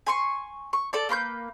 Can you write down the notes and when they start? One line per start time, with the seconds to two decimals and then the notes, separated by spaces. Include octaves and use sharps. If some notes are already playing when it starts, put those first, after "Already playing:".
0.07 G#5 C6 C#6
0.73 C#6
0.93 A4 D5 A5
1.09 A#3 B4 C6 G6